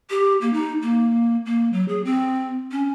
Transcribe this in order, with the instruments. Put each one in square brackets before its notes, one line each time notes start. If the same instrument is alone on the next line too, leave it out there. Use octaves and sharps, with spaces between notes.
[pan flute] G4
A#3
D#4
A#3
A#3
F#3
G#4
C4
C#4